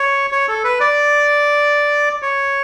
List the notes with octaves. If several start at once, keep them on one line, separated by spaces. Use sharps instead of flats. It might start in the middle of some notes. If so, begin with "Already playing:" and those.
Already playing: C#5
C#5
A4
B4
D5
C#5